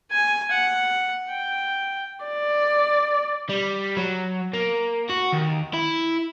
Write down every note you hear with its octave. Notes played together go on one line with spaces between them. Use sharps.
G#5
F#5
G5
D5
G3
F#3
A#3
F#4
D#2
E4